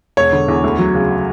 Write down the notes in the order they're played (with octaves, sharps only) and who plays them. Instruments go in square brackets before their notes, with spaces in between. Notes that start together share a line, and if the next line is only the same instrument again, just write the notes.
[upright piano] E1 C#5
D3
E2
D2
F#3
C#3